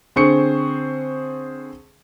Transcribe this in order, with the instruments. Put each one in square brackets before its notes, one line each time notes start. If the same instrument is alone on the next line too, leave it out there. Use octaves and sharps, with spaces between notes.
[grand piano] D3 C4 G#4 C5 C#6 C#7